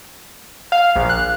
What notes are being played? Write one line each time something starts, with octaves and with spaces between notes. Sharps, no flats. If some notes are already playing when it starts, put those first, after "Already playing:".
F5
A#1
F#6